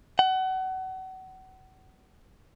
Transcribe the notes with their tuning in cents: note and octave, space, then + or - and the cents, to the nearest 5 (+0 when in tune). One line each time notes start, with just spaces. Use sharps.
F#5 +30